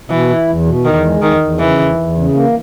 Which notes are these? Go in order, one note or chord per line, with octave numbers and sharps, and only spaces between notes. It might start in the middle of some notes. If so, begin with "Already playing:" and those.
B2 E3
E4
E2
B2
E2 D#3
G#3
E2 D#3
E2
C#3 E3
E2
E2
C#3
A#3